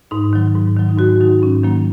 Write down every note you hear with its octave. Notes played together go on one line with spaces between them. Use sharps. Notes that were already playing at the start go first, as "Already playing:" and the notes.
G#2 D#4
D#3 F#3
G#2
D#3 F#3
D#4
G#2 F#4
D#3 F#3 D#4
G#2 C#4
D#3 F#3 A#3